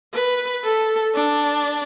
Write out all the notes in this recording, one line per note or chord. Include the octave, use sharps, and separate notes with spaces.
B4
A4
D4